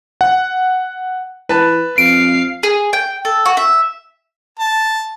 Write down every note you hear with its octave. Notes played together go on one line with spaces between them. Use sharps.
F#5
E3 B4 A5
F2 F5 C7 D7
G#4
G5
A4
F#4
E5
A5